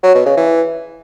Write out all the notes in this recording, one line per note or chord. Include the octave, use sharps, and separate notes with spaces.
F#3
B2
C#3
E3